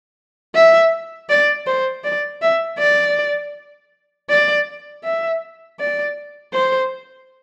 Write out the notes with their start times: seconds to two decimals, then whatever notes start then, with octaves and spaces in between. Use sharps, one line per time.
0.55 E5
1.30 D5
1.67 C5
2.04 D5
2.42 E5
2.79 D5
4.30 D5
5.04 E5
5.80 D5
6.54 C5